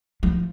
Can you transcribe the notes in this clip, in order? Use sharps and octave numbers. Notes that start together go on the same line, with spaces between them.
F3